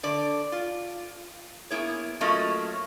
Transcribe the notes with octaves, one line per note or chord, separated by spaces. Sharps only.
D3 D5
F4
A#3 B3 E4 G#4 C#5
F#3 A3 A#3 C#4 F4 D#5